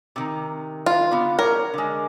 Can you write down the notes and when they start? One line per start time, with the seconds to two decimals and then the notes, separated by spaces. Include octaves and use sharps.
0.16 C3 D#3
0.86 F4
1.11 D3 B3
1.39 A#4 C#5
1.74 D3 G#3